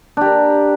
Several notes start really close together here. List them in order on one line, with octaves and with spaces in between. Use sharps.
D4 G4 A#4